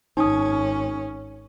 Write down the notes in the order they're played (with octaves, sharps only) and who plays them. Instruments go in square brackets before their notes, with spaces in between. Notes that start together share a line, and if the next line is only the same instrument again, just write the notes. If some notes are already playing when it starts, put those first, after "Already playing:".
[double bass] G#1 C#4 [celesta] D#4 D#6